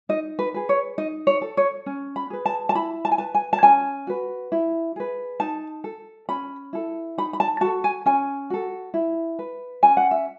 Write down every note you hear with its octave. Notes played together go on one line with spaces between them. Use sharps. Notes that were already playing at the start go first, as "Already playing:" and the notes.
D#4 D#5
B4
G#4 B4
C#5
D#4 D#5
C#5
A4
C#5
C#4
B5
G#4 B4
A5
A5
E4 B5
A5
G#5
B4 A5
G#5
A5
C#4 G#5
F#4 B4
E4
G#4 B4
D#4 A5
A4
C#4 B5
E4 A4
D#4 B5
B5
A5
F#4 A4 A5
G#5
C#4 G#5
F#4 A4
E4
B4
C#4 G#5
F#5
E5